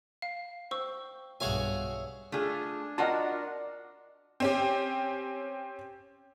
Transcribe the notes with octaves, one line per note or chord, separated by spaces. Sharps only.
F5
C5 G5 C#6 E6
B1 G2 F#4 G#4 C#5 E5 F5 G#5
A3 D4 F4 G#4
F4 F#4 A#4 D5 D#5 F#5 A5
C4 C#4 G4